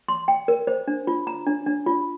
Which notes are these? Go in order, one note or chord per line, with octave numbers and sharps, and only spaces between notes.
C6
G5
A#4
C5
D4
F4
A#5
D4
D4
F4